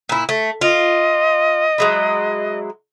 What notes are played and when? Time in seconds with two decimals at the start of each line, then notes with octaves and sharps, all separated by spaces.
0.09 A#2 E4
0.29 A3
0.61 F4 D#5
1.78 F#3 G#3 E4